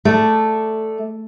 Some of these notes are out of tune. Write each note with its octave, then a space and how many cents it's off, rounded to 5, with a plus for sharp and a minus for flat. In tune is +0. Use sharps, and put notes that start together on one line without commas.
A3 +0 D5 +0